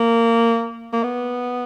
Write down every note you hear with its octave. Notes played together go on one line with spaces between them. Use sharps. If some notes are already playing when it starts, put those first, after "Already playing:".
Already playing: A#3
A#3
B3